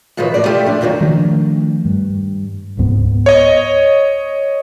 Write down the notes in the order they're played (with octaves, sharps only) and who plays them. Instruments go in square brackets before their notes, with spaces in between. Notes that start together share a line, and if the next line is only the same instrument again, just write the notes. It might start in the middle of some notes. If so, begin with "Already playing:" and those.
[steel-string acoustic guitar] A2 D#3 F3 F#3 B4 C#5
A2 D5
F3 A3 F4 G4
A2 D4
F2 A#2 D#3 E3 F#3
[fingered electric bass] D#3 F3 A3 D4
G2
D1 C#2 G#2 B3
[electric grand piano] C#5 D#5